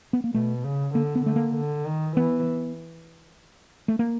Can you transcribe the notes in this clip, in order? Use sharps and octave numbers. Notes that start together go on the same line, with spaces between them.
B3
A#3
B2 A3
C#3
D3 A#3
B3
D3 A3
A#3
D3
D#3
E3 B3
A3
A#3